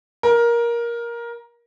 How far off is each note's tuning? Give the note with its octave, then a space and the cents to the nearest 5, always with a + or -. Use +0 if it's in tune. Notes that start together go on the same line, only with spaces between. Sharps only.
A#4 +15